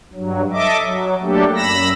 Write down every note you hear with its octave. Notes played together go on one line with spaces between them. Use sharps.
G2 F#3
A4 D#5 E5 D6
F#3
F#3 A3 A#3 D4 G4 A4
F#2 B5 E6 A#6